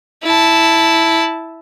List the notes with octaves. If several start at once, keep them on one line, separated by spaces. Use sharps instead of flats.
E4 A5